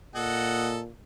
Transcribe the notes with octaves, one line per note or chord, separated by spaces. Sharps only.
A#2 A4 D#5 F#5